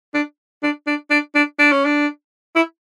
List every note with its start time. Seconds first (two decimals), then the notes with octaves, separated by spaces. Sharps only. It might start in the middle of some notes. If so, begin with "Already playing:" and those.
0.14 D4
0.63 D4
0.87 D4
1.11 D4
1.35 D4
1.59 D4
1.72 C#4
1.85 D4
2.56 E4